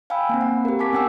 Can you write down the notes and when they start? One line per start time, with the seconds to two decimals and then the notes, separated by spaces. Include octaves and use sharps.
0.10 F5 G5 G#5 B5 E6
0.29 A#3 C4
0.41 F#5
0.65 G4 A#4
0.79 G#5 A5 C#6 D6 B6
0.93 B3 C#4 F#5 G5 E6